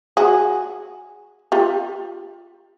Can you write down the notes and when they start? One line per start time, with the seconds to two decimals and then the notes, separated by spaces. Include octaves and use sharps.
0.17 F#4 G#4
1.52 F4 G4